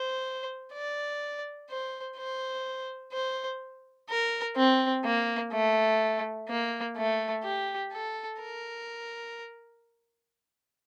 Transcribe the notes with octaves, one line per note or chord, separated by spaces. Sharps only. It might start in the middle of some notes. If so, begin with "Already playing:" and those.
Already playing: C5
D5
C5
C5
C5
A#4
C4
A#3
A3
A#3
A3
G4
A4
A#4